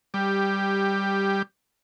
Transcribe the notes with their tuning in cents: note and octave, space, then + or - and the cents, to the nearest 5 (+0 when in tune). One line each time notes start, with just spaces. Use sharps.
G3 +0 G4 +10